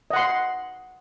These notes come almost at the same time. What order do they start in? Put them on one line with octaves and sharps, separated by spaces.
D#5 F#5 C6